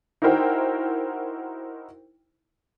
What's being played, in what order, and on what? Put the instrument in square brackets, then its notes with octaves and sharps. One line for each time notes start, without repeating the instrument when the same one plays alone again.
[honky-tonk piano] D#4 E4 F#4 A#4 C5 G5